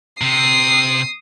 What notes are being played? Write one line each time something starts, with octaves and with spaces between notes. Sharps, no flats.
C3 D#6 C7